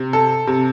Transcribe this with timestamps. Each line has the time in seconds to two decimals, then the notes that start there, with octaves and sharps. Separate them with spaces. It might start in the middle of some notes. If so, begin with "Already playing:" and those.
Already playing: C3
0.13 A4
0.47 C3